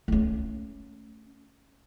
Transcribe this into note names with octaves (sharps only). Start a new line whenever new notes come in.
A3 C#4